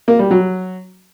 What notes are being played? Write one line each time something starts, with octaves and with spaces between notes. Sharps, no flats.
A#3
G3
F#3